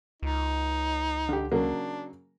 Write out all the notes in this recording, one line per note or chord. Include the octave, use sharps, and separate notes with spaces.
C#2 D#4
D3 G4
C#3 F#3 A#3 D4